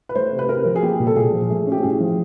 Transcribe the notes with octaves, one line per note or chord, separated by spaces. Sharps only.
B4
A3 C5
C3
B4
C3 A#4
F3
G#4
A#3 G4
A#2
A4
A#2 G#4
F3
A3 G#4
C#4 G4
A2 G#4
F3